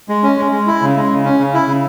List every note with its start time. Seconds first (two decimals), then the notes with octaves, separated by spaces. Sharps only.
0.09 G#3
0.23 C#4
0.38 G#3
0.52 G#3
0.67 E4
0.82 C#3
0.96 G#3
1.10 C#3
1.24 C#4
1.39 C#3
1.54 E4
1.67 C#3